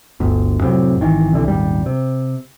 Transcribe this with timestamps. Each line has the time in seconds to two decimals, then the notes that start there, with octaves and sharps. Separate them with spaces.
0.20 G1 D2
0.61 F2 A2 C3 F#3
1.01 G#1 D#3 E3
1.33 C2 D3 E3
1.48 D#1 G#1 G3
1.86 C3